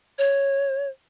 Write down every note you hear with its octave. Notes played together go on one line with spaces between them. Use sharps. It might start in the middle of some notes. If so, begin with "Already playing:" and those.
C#5